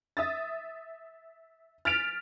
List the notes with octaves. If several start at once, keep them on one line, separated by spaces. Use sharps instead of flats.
E5 D#6 A6
F6 A6 B6 D7 F7